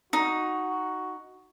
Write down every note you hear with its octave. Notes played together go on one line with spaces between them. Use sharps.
D#4 F#4